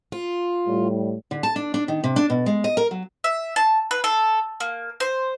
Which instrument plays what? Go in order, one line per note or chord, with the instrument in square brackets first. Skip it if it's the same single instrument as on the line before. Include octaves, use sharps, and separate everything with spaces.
[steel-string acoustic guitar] F4
[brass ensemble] A2 G3
[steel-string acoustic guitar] D3
A5
D4
D4
D#3
C3
D4
B2
G#3
D#5
A#4
F#3
[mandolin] E5
A5
B4
A4
A#3
C5